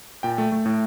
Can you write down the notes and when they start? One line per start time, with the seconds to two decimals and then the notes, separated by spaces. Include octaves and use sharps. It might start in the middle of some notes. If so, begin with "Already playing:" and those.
0.23 A#2 G5
0.38 A3
0.52 A3
0.66 A2